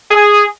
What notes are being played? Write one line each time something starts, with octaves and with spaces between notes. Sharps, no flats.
G#4